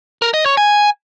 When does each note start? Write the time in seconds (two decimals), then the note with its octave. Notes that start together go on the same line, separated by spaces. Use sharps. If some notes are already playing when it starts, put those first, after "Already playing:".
0.22 A#4
0.34 D#5
0.46 C#5
0.57 G#5